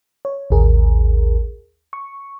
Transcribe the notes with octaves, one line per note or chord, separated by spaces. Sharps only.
C#5
A1 D#2 G#4 A#4
C#6